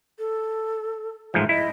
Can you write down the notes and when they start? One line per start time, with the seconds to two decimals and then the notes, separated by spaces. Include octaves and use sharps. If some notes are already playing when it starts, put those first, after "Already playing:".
0.19 A4
1.34 A1 G#2 F3 E5
1.49 E4 D#5